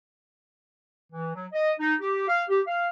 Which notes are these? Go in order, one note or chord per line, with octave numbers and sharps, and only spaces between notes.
E3
F#3
D#5
D#4
G4
F5
G4
F5